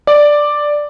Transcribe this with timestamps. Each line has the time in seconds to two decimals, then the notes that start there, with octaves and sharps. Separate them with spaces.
0.07 D5